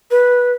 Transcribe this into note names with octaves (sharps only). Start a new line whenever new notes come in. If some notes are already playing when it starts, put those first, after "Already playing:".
B4